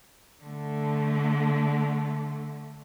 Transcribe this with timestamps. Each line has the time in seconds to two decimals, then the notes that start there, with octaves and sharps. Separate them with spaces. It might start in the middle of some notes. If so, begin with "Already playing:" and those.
0.43 D3 A3